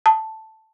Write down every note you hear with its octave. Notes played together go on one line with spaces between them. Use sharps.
A5